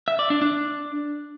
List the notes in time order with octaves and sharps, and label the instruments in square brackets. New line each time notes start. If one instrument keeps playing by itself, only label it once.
[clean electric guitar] E5
D5
D4
D4